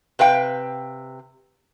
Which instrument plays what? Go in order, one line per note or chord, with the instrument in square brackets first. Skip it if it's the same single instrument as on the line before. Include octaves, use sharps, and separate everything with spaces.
[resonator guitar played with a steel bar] C3 B4 F5 G5